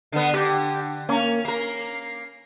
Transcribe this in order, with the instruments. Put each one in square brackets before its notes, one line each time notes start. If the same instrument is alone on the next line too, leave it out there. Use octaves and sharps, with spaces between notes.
[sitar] D3 B3
[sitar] D3 [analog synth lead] G4
[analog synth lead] A#3 [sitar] C#4
[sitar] A#3 A#4 [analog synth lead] C7